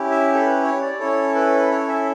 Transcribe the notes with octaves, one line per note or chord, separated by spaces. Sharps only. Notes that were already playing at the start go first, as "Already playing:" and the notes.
Already playing: C#4 E4 G4
E5
A4
B4
C#5
D5
C#4 E4 A4 C#5
B4
C#5
E5